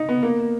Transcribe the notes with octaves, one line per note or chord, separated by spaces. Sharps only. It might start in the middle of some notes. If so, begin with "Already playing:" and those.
Already playing: D#4
B3
A#3